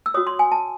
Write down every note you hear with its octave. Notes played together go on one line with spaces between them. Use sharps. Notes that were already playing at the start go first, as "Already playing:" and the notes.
E6
F#4 C#5 D#6
C6
G#5
A5